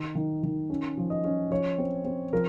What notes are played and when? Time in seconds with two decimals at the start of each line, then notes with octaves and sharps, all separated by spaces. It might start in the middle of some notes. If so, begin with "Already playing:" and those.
Already playing: D#3
0.15 D#3
0.43 D#3
0.70 C#4
0.97 F3
1.10 D#5
1.24 C#4
1.51 F3 C#5
1.78 C4
2.05 C4
2.33 F3 A#4